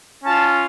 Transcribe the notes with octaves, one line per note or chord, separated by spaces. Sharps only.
C#4 F4 A5